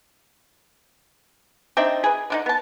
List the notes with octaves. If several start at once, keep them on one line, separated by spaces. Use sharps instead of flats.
C4 D4 D#4 E5
G#4 B4
D3 D4 D#4
B3 A5